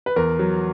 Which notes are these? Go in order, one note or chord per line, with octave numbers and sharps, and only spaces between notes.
B4
E2 A#4
F#3